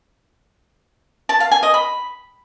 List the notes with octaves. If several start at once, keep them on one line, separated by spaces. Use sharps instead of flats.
A5
F5
G#5
D#5
B5